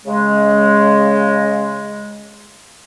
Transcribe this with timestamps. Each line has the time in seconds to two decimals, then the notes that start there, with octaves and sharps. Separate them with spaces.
0.06 C#3 G#3